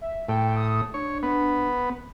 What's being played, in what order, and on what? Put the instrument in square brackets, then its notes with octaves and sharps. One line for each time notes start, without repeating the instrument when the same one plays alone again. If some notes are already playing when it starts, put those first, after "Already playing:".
[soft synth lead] E5
[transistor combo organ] A2 [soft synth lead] G5
[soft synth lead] D#6
[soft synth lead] D4 [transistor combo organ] C#5
[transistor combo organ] B3